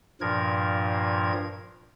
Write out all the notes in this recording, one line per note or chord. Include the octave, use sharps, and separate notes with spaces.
G2 A#2 F3 A#4 G#6